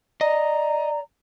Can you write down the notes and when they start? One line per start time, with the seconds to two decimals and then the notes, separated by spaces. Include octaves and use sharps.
0.21 D5 D#5 A#5